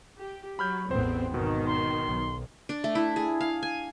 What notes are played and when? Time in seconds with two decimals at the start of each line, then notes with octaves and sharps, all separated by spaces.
0.18 G4
0.59 F#3 B5 F6 G6
0.91 A1 E2 B3 C4 C5
1.34 G#1 B2 D#3
1.67 C6
2.06 B1
2.69 D4
2.84 A3
2.95 E4
3.16 G#4
3.40 F5
3.63 G#5